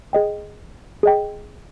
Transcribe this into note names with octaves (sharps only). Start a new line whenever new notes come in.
G#4 D#5 G5
G#4 D#5 G5